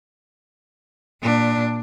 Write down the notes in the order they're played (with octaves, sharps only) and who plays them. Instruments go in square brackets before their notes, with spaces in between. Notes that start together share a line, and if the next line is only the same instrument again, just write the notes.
[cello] A#2 D4